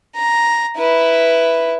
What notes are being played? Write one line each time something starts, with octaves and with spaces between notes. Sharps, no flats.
A#5
E4 B4